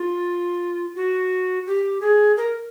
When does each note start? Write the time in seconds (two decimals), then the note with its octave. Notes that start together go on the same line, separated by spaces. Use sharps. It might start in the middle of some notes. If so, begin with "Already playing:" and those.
Already playing: F4
0.96 F#4
1.67 G4
2.01 G#4
2.37 A#4